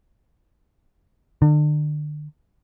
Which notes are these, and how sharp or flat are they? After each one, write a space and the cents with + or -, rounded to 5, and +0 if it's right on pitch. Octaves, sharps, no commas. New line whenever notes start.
D3 +40